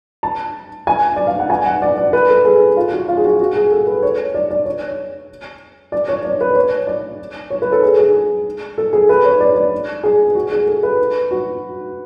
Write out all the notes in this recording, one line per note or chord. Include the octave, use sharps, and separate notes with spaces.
A5
G#5
D5
F5
F#5
G#5
F#5
D5
D5
B4
A4
G#4
F4
F#4
F4
G#4
F#4
F#4
G#4
A4
B4
C#5
D5
D5
C#5
D5
C#5
D5
B4
C#5
D5
C#5
B4
A4
G#4
G#4
A4
G#4
B4
C#5
D5
D5
G#4
F#4
G#4
A4
B4
F#4